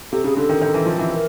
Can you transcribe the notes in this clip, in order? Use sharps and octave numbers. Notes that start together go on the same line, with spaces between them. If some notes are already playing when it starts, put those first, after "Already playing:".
C3 A4
C#3 G#4
D3 A4
D#3
D#3
E3
F3
E3
A#4